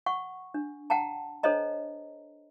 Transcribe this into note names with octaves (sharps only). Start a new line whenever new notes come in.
F#5 C#6
D4
F#5 G5 A5 A#5
D4 A4 C5 C#5 D#5 A#5